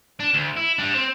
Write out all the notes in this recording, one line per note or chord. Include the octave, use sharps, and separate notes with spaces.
D4
D2
E4
G3 D4
C4